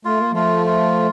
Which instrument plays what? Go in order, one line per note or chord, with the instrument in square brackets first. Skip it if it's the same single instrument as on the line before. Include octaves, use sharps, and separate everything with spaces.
[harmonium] A3 [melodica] F4
[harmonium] A#3
[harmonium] F3 A3 [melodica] F4
[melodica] F4